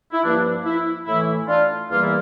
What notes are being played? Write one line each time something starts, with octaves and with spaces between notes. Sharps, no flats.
E4
G2 F3 A#3 D4
E4
A2 E3 A3 E4
D4 F4
E2 E3 G3 A#3 F4
E4